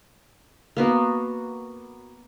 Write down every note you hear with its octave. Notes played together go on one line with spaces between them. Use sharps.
A#3 B3 F#4